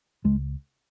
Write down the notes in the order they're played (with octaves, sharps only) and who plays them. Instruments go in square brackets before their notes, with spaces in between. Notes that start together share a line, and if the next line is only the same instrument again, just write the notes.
[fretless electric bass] C#2 G#3